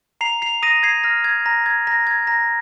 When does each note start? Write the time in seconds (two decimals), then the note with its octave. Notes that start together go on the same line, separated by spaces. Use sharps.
0.21 A#5 C7 F7
0.42 C7 F7
0.62 D#6 A#6 D#7
0.83 G#6 C7
1.04 F6 A#6
1.24 G#6
1.46 A#5 A#6
1.66 G#6
1.87 A#5 A#6
2.07 G#6
2.27 A#5 A#6